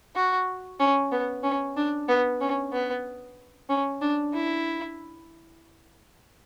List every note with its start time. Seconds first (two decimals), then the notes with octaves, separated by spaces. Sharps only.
0.15 F#4
0.80 C#4
1.12 B3
1.44 C#4
1.77 D4
2.08 B3
2.41 C#4
2.72 B3
3.69 C#4
4.01 D4
4.33 E4